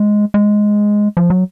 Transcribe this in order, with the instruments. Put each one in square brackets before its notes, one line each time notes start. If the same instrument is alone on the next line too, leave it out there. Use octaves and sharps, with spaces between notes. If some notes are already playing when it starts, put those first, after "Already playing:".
Already playing: [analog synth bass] G#3
G#3
F3
F#3